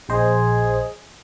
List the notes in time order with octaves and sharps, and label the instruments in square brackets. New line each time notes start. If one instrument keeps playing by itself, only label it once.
[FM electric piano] A#1 C5 D#5 [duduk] G#4